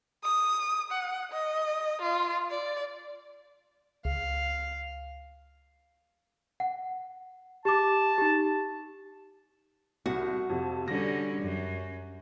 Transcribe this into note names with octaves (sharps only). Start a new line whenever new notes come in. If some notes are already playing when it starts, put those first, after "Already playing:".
D#6
F#5
D#5
F4
D5
C#2 F5
F#5
G4 A5 D6
D#4 G4
C2 F#4
F2 C3
D3 G3 C#4 A#6
F#2